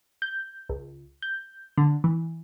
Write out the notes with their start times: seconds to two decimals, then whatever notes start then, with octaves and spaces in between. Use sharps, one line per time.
0.22 G6
0.69 C#2
1.22 G6
1.77 D3
2.04 E3